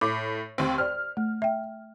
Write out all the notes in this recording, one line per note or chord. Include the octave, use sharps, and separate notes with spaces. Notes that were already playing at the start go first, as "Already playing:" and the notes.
A2 D6
D#2 C4
C5 D5 F6
A3
E5 G5